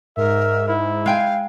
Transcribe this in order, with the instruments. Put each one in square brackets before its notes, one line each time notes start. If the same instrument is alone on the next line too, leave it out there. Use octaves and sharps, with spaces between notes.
[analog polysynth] G#2 [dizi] A#4 [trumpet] E5
[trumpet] E4
[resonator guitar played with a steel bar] G#3 G5 G#5 [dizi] F5